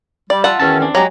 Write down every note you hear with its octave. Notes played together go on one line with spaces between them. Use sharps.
G3 D5
F4 E5 F#5 A5
E2 D#3 C#4 F#4 E5 A5
C4 D4
F#3 G#3 G4 A#5